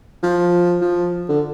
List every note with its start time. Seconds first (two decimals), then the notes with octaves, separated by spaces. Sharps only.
0.23 F3
0.81 F3
1.29 D3